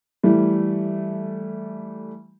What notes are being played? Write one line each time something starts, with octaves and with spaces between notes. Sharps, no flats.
E3 G3 A3